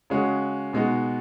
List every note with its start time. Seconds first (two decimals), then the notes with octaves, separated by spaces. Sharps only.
0.10 C#3 G#3 C#4 F#4
0.73 B2 G#3 D#4 F#4